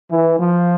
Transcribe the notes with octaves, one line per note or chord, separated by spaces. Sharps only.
E3
F3